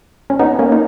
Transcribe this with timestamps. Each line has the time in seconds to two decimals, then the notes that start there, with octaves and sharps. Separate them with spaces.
0.30 C#4
0.39 B3 D#4
0.59 A#3 C#4
0.72 D#4